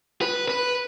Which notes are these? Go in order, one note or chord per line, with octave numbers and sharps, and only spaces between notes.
B4
B4